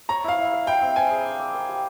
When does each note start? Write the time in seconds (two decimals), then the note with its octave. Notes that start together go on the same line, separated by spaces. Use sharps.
0.09 C#5 A#5
0.24 E4 F5
0.39 E4
0.53 F5
0.67 E4 G5
0.82 C4
0.96 C4 G#5
1.11 G#4
1.25 D4
1.39 D5
1.53 A#4
1.69 G4